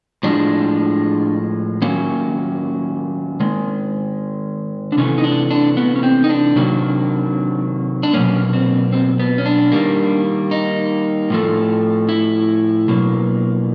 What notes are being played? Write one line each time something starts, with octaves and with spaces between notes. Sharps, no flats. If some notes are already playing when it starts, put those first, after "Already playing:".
A2 F3 G#3 D4
D#3 F#3 A#3 C#4
D#3 G#3
D4
C3 E3 A3 C#4
D#4
D4
D4
B3
C#4
C4
D#4
D4
C3 D#3 F#3 A#3
D4
B2 F#3 A#3 C#4
C4
C4
B3
C#4
D4
D#3 G3 A#3
D#4
A2 F3 A3
E4
B2 F#3 A#3